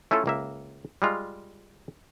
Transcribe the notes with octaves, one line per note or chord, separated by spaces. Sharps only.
A3 C#4 E4 F4 A4
C#2 A#3 E5
G3 G#3 F4